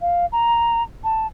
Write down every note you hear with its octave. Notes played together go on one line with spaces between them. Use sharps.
F5
A#5
A5